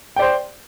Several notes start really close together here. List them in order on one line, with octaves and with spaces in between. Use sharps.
G5 D5 C5